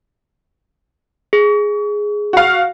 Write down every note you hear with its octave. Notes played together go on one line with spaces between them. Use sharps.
G#4
F#4 F5